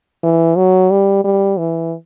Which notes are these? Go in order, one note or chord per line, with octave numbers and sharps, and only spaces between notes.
E3
F#3
G3
G3
E3